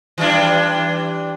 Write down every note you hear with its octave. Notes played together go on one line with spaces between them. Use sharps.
E3 G3 D4